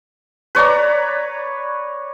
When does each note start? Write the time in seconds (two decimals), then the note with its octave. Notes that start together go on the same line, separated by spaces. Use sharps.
0.55 B4 C#5 D5 A#5